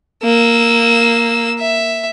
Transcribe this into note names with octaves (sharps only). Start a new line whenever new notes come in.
A#3 E6
E5